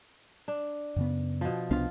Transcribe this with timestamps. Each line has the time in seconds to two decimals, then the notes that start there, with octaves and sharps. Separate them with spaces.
0.48 D4
0.96 F#2 C#3 B3
1.41 B2 F3
1.71 C2 B3 D4 F4 F5